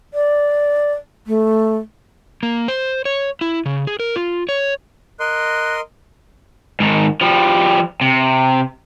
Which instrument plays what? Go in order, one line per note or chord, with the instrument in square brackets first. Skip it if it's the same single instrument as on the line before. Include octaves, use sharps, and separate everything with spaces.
[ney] D5
A3
[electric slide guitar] A#3
C5
C#5
E4
C#3
G#4
A#4
F4
C#5
[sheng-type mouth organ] A#4 D#5 C6 [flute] F#6
[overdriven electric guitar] G#2 D#3
F3 G3
C3